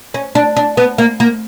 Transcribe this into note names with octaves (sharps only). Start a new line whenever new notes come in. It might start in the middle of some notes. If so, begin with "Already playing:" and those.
C#4
D4
D4
B3
A#3
A#3